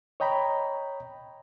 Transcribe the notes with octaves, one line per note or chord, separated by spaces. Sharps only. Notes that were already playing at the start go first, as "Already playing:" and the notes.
C#5 D#5 G5 A#5 B5